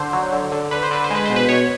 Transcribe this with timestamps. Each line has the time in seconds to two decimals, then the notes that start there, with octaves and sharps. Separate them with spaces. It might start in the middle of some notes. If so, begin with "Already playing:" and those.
Already playing: D3 C5
0.13 F#3
0.33 D3
0.52 D3
0.71 D3 B4
0.83 C5
0.91 D3 B4
1.04 C5
1.10 G#3 B4
1.25 B2 C5
1.36 B4
1.49 B2 C#5